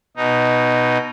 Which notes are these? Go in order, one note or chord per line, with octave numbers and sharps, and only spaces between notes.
B2 D#4